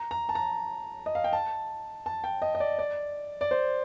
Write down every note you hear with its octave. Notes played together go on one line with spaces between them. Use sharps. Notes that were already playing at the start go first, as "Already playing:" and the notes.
Already playing: A#5
A#5
A5
A#5
D#5
F5
G5
A5
A5
G5
D#5
D#5
D5
D5
D5
C5